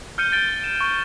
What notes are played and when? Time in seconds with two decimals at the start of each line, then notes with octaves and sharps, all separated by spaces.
0.18 F6 G6 C#7 D#7 G7
0.32 G6 A6 D7 G7
0.64 E7
0.81 C#6